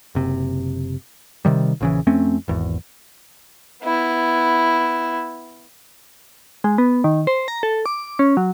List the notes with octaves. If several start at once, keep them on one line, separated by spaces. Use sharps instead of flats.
F#1 C3
C3 D#3 G3
A#1 C#3 E3
F2 A3 C4 C#4
G#1 E2
B3 E4
G#3
B3
D#3
C5
A#5
A4
D6
C#4
F#3